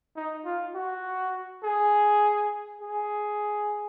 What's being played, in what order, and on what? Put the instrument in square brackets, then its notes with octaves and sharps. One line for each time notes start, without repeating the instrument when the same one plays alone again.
[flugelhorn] D#4
F4
F#4
G#4
G#4